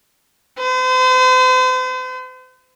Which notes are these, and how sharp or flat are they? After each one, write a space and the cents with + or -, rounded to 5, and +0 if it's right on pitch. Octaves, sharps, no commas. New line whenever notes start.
C5 -40